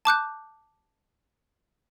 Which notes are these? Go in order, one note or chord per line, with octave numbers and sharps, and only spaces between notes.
A5 D6 F#6 G6